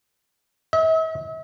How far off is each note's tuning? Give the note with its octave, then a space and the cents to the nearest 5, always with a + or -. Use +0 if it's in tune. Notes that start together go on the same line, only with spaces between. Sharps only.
E5 -45